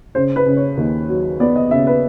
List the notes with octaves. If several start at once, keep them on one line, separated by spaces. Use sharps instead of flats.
C#3 C5
B4
C#3
C#5
D#2
F#3
B3 D5
D#5
C#3 E5
B4